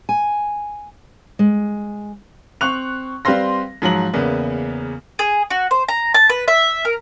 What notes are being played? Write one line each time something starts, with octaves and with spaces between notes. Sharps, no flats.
G#5
G#3
C4 C#6 F#6 F7
G3 C4 B4 F5 C6 A#6
G#2 F3 F#3 A#5 F#7
E2 C#3 A#3 B3
G#4
F#4
C5
A#5
A5
B4
E5
A#4